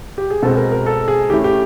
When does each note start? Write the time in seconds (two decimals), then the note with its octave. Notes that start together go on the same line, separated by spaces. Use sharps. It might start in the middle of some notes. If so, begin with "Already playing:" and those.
0.18 G4
0.30 G#4
0.42 B2 G#3 C4 A4
0.57 A#4
0.72 A#4
0.86 A4
1.08 G#4
1.30 E3 A3 C#4 E4 G4
1.44 G4